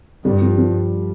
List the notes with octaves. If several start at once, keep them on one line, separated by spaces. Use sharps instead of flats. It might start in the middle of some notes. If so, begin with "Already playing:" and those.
G2 G3
F3
F3